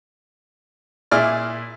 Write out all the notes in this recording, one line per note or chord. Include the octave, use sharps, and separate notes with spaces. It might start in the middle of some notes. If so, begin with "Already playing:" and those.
A#2 E4 G#4 D5 F6